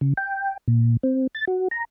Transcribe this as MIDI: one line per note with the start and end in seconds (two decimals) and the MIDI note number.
0.01 0.13 49
0.17 0.57 79
0.68 0.97 46
1.03 1.27 60
1.35 1.45 93
1.47 1.68 66
1.71 1.84 82